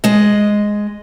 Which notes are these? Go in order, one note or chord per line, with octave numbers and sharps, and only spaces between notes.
G#3 D#5